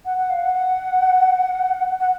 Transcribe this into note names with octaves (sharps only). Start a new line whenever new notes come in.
F#5
F#5
F5
F#5
F#5
F#5